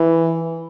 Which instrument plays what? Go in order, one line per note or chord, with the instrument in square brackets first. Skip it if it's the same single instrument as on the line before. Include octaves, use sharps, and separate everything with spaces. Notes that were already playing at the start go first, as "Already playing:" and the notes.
Already playing: [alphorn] E3